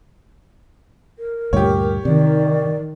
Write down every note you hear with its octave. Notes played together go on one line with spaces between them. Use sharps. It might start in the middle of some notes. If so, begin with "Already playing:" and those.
A#4
D2 G2 A#2 G4 C#5
C3 D#3 D5